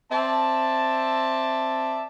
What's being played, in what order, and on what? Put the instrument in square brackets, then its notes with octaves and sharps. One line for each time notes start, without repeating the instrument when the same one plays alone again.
[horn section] C4 D5 E5 A5